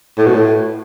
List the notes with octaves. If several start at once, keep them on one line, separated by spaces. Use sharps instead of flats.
A2
B2
A2